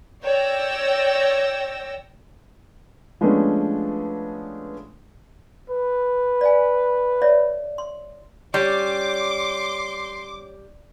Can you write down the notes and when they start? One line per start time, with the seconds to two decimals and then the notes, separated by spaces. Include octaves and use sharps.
0.23 C#5 D5 G5 E6 A#6
3.21 F3 G#3 A3 B3 C#4 D4
5.70 B4
6.41 D5 F5 G#5
7.22 C#5 D5 E5
7.78 C6
8.54 G3 C#4 G5 C6 D6